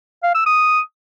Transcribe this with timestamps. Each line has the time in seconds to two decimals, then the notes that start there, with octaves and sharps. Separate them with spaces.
0.23 F5
0.35 E6
0.46 D#6